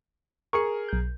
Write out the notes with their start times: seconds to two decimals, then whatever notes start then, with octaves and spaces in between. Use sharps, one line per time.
0.53 G#4 A#4 C#6 C#7
0.89 B1 G6